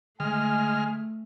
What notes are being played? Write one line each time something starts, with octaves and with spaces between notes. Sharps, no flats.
D3 G#3 A3 G#5 F6